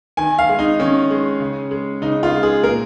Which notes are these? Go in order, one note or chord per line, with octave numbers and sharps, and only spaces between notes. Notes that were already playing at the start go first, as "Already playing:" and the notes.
D#3 G#5
F5
G#3
D#4
D#3 C#4
G#3
C#3
G#3
C#3 D#4
F4
G#3
G#4
A#2 A#4